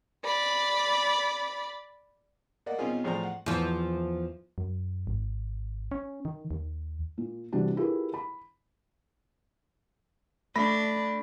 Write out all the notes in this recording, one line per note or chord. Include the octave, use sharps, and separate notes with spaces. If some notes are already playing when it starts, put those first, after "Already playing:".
D5 B5
A#3 D5 D#5 F#5
B2 C4 C#4 D#4 F4 G#4
A2 F3 G#4 C5 D5 A#5
F#5
E2 F3
F#2
G#1
C#4
D#3
D#2
A#2
C3 E3 G3 D4 F#4
E4 F4 G4 G#4 A#4 B4
B5
A3 D4 B5 A#6